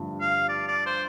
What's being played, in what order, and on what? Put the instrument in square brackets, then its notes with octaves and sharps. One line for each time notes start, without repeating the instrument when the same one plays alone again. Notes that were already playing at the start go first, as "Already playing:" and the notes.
Already playing: [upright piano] G2 D3 F3 A3
[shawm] F5
D5
D5
C5